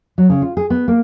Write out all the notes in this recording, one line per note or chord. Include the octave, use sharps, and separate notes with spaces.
F#3
C#3
F4
G#4
B3
A#3